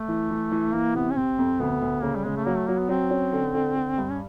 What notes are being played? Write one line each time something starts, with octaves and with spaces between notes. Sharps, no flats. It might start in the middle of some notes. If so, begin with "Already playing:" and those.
Already playing: A3
E3
E3
E3
E3 A#3
C3 B3
C#4
C3 C4
F2
D2 B3
D2
C#3 A#3
G3
C#3 G#3
A3
F#3 A#3
A3
F#3 A#3
B3
F#3 C4
C#4
D3
D3
D3
G2
C#4